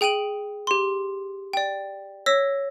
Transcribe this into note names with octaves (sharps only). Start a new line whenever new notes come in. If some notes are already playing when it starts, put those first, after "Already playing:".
G#4 G5 D7 D#7 F#7
G4 C6
D5 G5
C#5 E6 A#6 B6